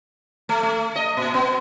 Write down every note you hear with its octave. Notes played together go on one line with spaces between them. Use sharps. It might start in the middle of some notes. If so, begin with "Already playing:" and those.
A3
A3
D#5
A#2
B3